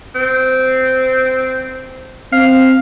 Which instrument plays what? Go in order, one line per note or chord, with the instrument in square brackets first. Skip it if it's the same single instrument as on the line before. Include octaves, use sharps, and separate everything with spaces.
[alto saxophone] C4
[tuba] C4 [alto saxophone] F5